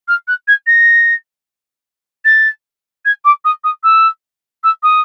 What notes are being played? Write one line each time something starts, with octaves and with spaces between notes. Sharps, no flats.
F6
F#6
G#6
A#6
A6
G#6
D6
D#6
D#6
E6
E6
D#6